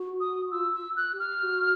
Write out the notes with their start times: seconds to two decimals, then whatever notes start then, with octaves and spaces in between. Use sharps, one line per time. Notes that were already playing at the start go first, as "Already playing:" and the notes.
Already playing: F#4
0.20 D#6
0.51 F4 E6
0.74 E6
0.96 F#6
1.13 G4
1.19 F6
1.42 F#4